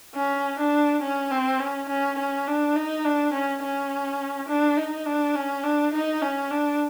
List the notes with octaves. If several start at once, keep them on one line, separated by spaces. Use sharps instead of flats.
C#4
D4
C#4
C4
C#4
C#4
C#4
D4
D#4
D4
C#4
C#4
D4
D#4
D4
C#4
D4
D#4
C#4
D4